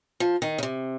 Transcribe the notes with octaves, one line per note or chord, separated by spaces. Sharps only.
F3
D#3
C#3
C3